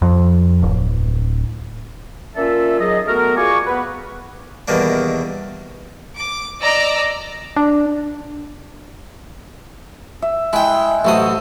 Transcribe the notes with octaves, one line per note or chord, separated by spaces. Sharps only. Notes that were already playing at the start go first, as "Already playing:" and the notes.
F2
D1
A#3 C#4 F4 A4 D5 E5
D#3 F#3 G#4 D#5
A3 B3 F#4 A#4
F4 F#4 G#4 D5 G#5 C#6
B3 B4
E2 B2 D#3 G3 A#3 D4
D6
D5 D#5 A#5 D6 E6
D4
E5
G#3 E4 G5
A1 F#3 A4 C5 E5 D#6